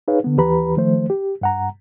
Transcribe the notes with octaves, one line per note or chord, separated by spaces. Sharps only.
D#4 G#4 B4 C#5 F5
D3 B3
D#2 E3 G4 B4 A#5 B5
D#3 F3 A3 C5
G4
G2 F#5 A#5